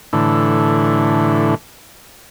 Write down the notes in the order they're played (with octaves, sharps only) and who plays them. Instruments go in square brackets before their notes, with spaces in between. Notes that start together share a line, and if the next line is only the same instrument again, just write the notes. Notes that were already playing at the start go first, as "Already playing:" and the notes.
[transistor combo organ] A2 D3 E3